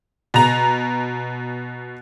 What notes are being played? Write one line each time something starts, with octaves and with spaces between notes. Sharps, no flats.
B2 A#5